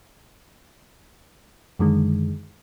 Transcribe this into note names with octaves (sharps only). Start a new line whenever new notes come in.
F#2 D3 D#3 G#3